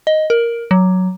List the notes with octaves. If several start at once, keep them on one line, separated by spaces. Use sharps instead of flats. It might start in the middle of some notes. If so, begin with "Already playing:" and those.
D#5
A#4
F#3